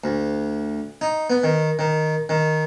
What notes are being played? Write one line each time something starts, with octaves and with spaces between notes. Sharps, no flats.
D2
D#4
B3
D#3
D#3
D#3